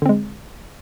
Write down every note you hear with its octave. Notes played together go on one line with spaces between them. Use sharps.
D3 G#3 C4